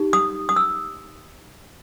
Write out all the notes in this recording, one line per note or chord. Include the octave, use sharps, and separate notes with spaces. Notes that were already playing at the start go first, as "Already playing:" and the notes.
Already playing: D#4 G4
D#6
D#6
E6